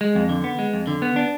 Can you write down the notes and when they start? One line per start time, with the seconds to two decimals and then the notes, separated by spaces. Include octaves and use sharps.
0.01 G#3
0.15 F2
0.29 D3
0.44 B3
0.59 G#3
0.74 F2
0.87 D3
1.02 B3
1.16 D4